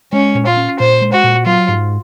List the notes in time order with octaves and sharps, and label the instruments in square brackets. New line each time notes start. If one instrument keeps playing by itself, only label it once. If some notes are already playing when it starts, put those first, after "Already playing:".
[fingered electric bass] G#3 [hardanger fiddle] C#4
[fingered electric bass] A#2
[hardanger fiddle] F4
[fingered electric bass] C#4
[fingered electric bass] A#2 [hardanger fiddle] C5
[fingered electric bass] G#3
[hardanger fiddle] F#4
[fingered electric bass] A#2
[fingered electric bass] F#3 [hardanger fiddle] F4
[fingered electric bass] G#2